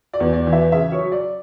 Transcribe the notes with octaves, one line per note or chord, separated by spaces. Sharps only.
D5
E2
D5
E3
E5
C#3 E5
C#5
F#3
D5